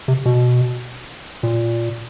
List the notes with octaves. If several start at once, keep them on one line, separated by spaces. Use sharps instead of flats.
C3
B2
A#2